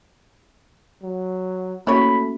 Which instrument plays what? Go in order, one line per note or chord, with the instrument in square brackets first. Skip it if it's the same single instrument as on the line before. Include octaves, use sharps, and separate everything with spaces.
[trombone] F#3
[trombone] A3 [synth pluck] A#3 C#4 F#4 [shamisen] E4 C#5 [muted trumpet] B5